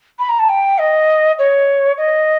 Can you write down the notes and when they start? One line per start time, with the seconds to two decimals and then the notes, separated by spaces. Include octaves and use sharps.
0.19 B5
0.29 A#5
0.39 A5
0.49 G5
0.78 D#5
1.39 C#5
1.98 D#5